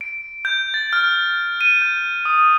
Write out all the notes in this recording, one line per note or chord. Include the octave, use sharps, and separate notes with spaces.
D7
G6
A6
F6
D#7
G6
D#6